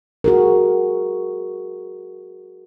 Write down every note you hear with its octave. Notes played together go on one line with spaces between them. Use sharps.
F#4 G#4 A#4